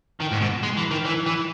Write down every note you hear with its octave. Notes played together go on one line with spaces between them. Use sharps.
D#3
G#2
B2
G#3
E3
D#3
E3
E3